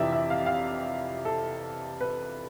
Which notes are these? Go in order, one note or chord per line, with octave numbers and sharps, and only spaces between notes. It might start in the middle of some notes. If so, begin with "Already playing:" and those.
Already playing: F2 C3 E3 D5 E5
E5
F5
F5
A4
B4